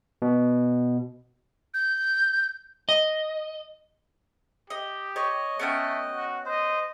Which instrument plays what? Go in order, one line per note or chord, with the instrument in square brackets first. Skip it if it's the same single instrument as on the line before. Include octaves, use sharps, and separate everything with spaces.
[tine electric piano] B2
[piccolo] G6
[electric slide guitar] D#5
[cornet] G4 [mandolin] D#5
[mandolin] C#5 [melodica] D#5
[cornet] A3 [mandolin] B3 C#4 G5
[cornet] F#4
[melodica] C5 [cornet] D#5